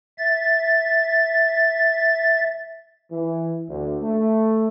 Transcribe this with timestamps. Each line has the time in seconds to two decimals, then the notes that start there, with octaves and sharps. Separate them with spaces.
0.18 E5 A6
3.12 E3
3.69 D2
4.02 A3